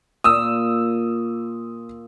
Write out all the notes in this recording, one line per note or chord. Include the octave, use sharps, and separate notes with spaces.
A#2 D#6 E6